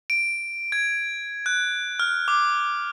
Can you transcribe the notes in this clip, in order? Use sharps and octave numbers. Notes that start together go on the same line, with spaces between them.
D7
G#6
F#6
F6
D6